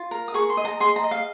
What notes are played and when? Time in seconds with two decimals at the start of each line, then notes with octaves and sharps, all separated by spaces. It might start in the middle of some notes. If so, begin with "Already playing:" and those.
Already playing: F4
0.11 A#4
0.28 D#6
0.34 G#4 C#6
0.49 C6
0.57 D#5
0.65 A#5
0.80 G#4 C6
0.96 A#5
1.03 D#5
1.11 F5